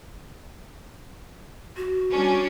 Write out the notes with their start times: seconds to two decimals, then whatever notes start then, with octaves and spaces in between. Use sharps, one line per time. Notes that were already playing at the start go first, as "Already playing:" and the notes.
1.77 F#4
2.11 G3 C#4 D4